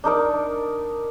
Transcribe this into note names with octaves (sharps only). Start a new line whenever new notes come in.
D4 D#4 A#4 D5